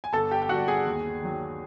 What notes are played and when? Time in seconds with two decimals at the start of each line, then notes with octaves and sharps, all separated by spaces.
0.04 G#5
0.13 G1 A4 A5
0.31 G4 G5
0.42 G5
0.49 G2 D3 G3 F#4 F#5
0.68 G#4 G#5
0.86 D#2
1.22 D#3 F#3